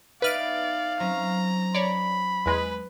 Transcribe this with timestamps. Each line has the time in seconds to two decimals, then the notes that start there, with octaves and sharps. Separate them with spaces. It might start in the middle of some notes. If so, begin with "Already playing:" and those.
0.22 B3 D#4 B4 D5 E5 F5 F6 D7
1.00 F#3 C4 C#4 A#5
1.75 C#5 D5 B5
2.46 E2 G#3 B4